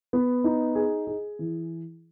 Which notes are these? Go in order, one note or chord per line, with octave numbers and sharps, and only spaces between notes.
B3
D#4
G#4
G#4
E3